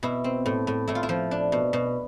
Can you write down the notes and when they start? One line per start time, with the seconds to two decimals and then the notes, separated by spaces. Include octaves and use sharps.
0.03 B2 E4
0.24 C4
0.46 A2
0.67 A2
0.87 A2 E4
0.95 F4
1.03 E4
1.09 F3
1.31 D4
1.52 B2
1.73 B2